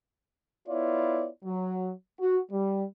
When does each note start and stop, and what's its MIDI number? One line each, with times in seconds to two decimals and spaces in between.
0.68 1.28 59
0.68 1.28 64
0.68 1.28 65
0.68 1.28 73
0.68 1.28 74
1.44 1.91 54
2.20 2.39 66
2.52 2.85 55